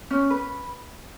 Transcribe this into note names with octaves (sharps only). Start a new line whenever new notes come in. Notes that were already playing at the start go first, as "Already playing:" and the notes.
C#4
B4